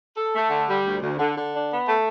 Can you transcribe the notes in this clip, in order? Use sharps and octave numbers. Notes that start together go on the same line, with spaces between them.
A4
A3
D3
G3
D2
D2
D3
D3
D4
B3
A3